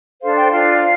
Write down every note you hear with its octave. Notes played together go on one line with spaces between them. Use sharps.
D4 A4 C5 F5
G5
D4 F4 C5 F5